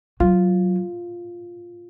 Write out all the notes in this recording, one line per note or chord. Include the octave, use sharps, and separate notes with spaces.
F#3 F4